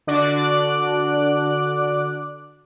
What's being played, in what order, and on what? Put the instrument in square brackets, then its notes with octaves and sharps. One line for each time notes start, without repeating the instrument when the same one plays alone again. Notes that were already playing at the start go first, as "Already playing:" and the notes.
[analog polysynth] D3 D4 F#4 D5 D6 F#6